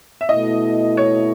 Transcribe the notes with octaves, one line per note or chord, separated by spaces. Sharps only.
E5
B2 A3 E4 D#5
C#5